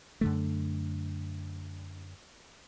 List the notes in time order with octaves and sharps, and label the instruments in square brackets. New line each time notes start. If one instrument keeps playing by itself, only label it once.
[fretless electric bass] F#2 D3 A3